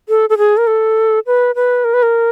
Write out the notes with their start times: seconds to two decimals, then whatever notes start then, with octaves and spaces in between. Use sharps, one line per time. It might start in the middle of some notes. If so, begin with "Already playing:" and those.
0.09 A4
0.30 A4
0.38 G#4
0.57 A#4
0.67 A4
1.27 B4
1.55 B4
1.85 A#4
1.94 B4
2.03 A#4